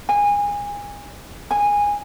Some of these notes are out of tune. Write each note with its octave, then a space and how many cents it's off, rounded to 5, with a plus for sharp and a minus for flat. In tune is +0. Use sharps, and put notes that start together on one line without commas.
G#5 -25
G#5 -15